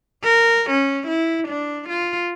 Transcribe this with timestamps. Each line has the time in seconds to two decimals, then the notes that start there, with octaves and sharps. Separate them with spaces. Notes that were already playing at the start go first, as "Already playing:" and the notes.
0.23 A#4
0.70 C#4
1.08 E4
1.48 D4
1.89 F4